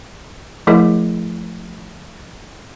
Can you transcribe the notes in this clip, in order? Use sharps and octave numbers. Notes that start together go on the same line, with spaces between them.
F3 A3 E4 G#4 A#4 D#5